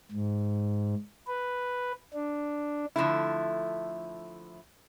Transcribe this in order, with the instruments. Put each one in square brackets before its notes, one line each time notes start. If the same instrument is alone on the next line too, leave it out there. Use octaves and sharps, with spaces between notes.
[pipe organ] G#2
B4
D4
[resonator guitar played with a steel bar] D3 F3 A3 E4